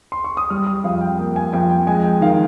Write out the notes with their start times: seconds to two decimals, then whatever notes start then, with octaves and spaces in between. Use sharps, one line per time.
0.12 C6
0.24 C#6
0.37 D#6
0.50 G3 F6
0.67 D#6
0.84 F2 F5
1.01 G5
1.18 A#3 G5
1.36 G#5
1.53 F2 G5
1.70 G5
1.87 G#3 G#5
2.04 G5
2.21 D#3 F5